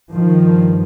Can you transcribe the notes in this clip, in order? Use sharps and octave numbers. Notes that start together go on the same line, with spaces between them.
G2 D#3 F3